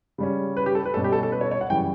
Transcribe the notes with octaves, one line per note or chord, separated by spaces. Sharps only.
C#3 G3 C#4
B4
G4
A4
B4
B2 G3 C#4 A4
G4
A4
A4
B4
C#5
C#5
F#5
F#2 C#3 E3 G3 G5